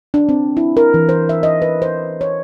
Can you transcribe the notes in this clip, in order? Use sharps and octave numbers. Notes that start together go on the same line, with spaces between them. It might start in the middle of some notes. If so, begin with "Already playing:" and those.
D4
C4
E4
A#4
E3
C5
E5
D#5
B4
C5
C#5